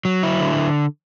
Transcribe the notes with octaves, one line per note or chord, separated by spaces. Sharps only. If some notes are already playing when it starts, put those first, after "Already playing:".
F#3
E4
D3